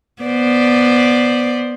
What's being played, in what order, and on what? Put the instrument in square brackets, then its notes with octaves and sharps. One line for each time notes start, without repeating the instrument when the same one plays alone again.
[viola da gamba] B3 C5 D5